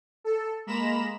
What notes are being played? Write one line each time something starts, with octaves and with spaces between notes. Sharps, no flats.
A4
G#3 A#3 A#5 B5 E7